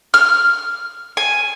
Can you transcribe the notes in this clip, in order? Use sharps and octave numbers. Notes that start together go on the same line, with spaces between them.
F6
G#5